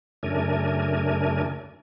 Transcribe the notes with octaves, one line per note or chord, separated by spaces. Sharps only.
F#2 C#3 A3 D4 A#4 G#5